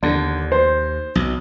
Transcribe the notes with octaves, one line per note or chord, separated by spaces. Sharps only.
D#2 D3
C5
B1